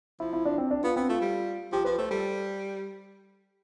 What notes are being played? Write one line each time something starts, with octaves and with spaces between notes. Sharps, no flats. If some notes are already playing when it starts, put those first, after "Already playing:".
F3 E4
E4
D4
C4
D4
B3 F4
B3 C4
A3 F4
G3
F3 G4
F3 B4
A3 C5
G3 A4